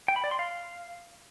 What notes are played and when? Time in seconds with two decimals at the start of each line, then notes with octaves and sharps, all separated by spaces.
0.08 G5
0.16 B5
0.24 D5
0.31 C6
0.39 F5